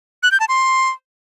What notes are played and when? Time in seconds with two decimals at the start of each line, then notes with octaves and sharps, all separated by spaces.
0.23 F#6
0.31 G6
0.40 A5
0.49 C6